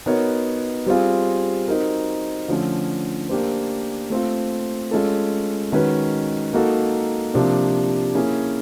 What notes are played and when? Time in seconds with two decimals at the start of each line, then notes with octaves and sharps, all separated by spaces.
0.06 B3 D#4 F#4 A#4 C#5
0.86 G3 C4 F4 G#4
1.68 C4 D#4 F#4 A#4
2.48 D3 F3 A3 C#4
3.29 A#3 D4 G4 C5
4.10 A3 C4 F4
4.91 G#3 C#4 F4 A4
5.72 D#3 G#3 C#4 F#4 B4
6.53 A#3 D#4 F#4 A4
7.34 C3 F3 A#3 D4
8.14 A#3 C#4 E4 G#4